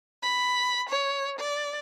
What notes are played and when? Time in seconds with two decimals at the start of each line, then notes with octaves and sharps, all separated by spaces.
0.23 B5
0.89 C#5
1.39 D5